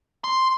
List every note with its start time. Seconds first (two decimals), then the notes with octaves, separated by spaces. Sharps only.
0.24 C6